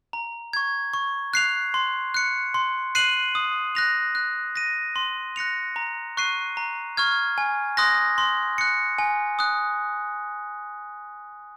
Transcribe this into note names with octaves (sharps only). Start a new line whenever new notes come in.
A#5
C#6 G#6
C#6
F#6 C7 F7
C6
F#6 C#7
C6
F#6 C7 D#7 F#7
D#6
F#6 A#6 F7
F#6
A#6 D#7
C6
F#6 A#6 C#7 F7
A#5
C#6 F#6 C7 D#7
A#5
C#6 F6 G#6
G#5
C6 D#6 F#6 A#6
C6
F#6 C#7
G#5
D#6 F#6